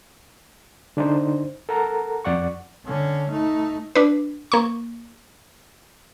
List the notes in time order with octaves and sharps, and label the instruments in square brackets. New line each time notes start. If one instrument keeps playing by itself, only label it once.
[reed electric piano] D3 D4 D#4 C5
A4 A#4 F#5 A#5
F2 D5 F#5 C#6
[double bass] D3 C#4
A3 D#4
[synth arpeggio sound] D4 B4
A#3 C#6